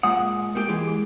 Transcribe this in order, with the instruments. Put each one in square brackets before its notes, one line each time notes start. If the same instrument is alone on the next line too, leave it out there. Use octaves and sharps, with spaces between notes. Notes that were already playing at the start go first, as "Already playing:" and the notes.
[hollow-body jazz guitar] A#2 G#3 F#5 [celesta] D#6
[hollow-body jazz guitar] A3 A#3 G4
E3 G#3 G4